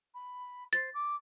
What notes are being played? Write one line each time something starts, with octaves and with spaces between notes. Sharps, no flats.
B5
C5 A6
D6